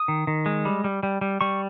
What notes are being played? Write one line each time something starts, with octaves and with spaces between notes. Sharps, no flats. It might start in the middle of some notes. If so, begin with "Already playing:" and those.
Already playing: D#6
D#3
D#3
G#3
G3
G3
G3
G3
G3 C#6